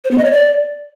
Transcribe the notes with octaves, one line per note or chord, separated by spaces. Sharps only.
C5
B3
D#5
C#5
D5